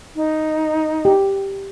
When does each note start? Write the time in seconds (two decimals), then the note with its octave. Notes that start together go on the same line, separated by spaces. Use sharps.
0.16 D#4
1.05 G4